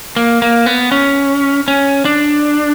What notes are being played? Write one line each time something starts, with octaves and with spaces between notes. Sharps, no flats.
A#3
A#3
B3
C#4
C#4
D4